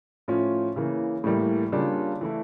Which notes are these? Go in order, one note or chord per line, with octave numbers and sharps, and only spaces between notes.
A2 F3 C#4 F4
C#3 E3 A#3
A2 E3 G3 A#3
C#3 G3 A#3 D4 F4
E3 A3 E4